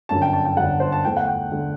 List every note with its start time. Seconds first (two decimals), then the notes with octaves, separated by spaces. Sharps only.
0.09 G1 F#2 D3 A5
0.22 G5
0.33 A5
0.45 G5
0.57 G1 F#2 D3 F#5
0.80 C5
0.92 A5
1.05 E2 D3 A3 G5
1.17 F#5
1.28 G5
1.51 D3 A3